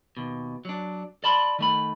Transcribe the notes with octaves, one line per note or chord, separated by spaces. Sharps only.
D#2 B2
F#3 D4
D5 A5 B5 C6
D#3 A3 B5